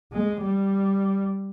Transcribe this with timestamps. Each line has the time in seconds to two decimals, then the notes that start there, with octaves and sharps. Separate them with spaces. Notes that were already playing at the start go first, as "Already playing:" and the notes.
0.12 G#3
0.42 G3